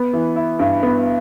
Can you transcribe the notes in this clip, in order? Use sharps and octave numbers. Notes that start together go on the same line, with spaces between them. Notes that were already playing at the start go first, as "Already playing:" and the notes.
Already playing: B3
E3
E4
G2
B3